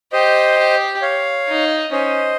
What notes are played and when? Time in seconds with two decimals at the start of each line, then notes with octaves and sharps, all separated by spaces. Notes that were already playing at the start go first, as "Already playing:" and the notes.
0.12 G4 C5 D#5
0.57 G4
1.02 C#5 F5
1.48 D#4
1.92 C#4 C5 D#5